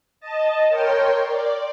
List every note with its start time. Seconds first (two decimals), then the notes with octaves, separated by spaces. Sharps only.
0.20 D#5 A5
0.69 A#4 C#5 G5 C6
1.27 D5